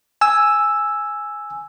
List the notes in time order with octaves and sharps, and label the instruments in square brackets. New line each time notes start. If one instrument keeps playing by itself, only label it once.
[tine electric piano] G#5 E6